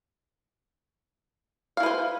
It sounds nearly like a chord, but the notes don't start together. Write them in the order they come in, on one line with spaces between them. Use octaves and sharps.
F5 E4 B4 C5